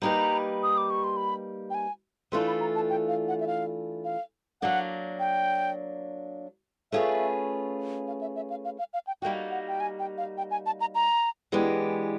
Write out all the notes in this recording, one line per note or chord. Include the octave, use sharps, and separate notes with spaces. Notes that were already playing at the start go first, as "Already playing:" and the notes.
G3 A#3 D#4 G4 B4 A#5
D#6
D6
C#6
C6
B5
G5
G#5
E3 A3 D4 F4 A4 C6
B5
A#5
A5
G5
F5
F#5
E5
F5
F5
F#3 A#3 D4 F#5
G5
A3 C#4 F4 G#4 B4 E5
F5
E5
E5
F5
F5
F5
F5
G5
G3 A#3 D#4 F#4 G5
F#5
G5
G#5
G5
F5
G5
G#5
A5
A#5
A#5
E3 G#3 B3 D4 G4